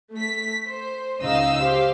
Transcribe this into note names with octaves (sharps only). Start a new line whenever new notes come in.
A3 B6
C5
C#2 C#3 D#4 D#5 F5 E6
G4 C5 F5